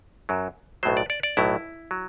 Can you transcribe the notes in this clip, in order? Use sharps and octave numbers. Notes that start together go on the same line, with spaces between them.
F#2 F#3
B1 A2 F#3 C5
D5
D5
D5
B1 A2 F#3 E4
F#3